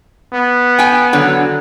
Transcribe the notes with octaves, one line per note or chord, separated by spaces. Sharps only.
B3
G5 G#5
D3 F#3